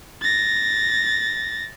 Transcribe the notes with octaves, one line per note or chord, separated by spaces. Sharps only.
A6 A#6